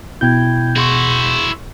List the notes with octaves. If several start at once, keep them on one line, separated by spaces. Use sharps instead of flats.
B2 E4 G5 G6 G#6
E4 F#4 G#4 C6 C#6